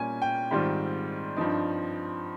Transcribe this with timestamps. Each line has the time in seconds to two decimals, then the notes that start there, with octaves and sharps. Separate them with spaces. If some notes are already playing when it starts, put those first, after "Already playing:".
Already playing: A#2 G3 A#3 C#4 G#5
0.22 G5
0.51 G#2 D#3 G3 C4 F4
1.37 G2 F3 C4 D#4